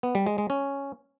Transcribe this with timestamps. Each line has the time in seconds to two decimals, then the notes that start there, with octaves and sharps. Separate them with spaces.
0.03 B3
0.15 G3
0.27 G#3
0.38 G#3
0.50 C#4